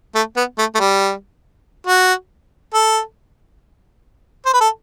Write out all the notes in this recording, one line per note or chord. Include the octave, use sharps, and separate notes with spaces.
A3
B3
A3
A3
G3
F#4
A4
C5
B4
A4